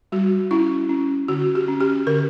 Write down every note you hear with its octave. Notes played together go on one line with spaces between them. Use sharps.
G3 F#4
C#4 E4
C#4
D3 F#4
G4
C#4
G4
D3 A#4